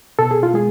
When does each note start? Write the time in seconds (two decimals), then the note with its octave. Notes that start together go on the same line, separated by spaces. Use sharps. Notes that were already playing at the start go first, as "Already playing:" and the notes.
0.19 B2 A4
0.31 G#4
0.43 F4
0.54 G#3 G#4